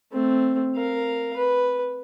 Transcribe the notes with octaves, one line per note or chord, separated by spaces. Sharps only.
A3 C4
A#4 F5
B4